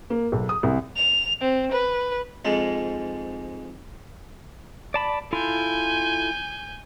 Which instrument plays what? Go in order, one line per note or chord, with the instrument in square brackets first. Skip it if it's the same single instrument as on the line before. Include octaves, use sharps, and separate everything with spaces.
[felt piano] A#3
B1
D#6
C2
[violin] F7
C4
B4
[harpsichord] F2 G#2 G#3
[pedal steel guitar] D5 A5 B5
[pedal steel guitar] E4 F4 A4 [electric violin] G#5 G6